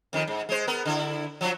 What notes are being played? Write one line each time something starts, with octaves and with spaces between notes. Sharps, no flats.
F2 D#3
G#2
G#3 C5
B3 A#4
D3 E4
F3 F#3